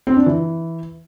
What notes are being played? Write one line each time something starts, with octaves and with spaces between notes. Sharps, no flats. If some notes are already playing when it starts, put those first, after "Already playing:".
C4
D4
E3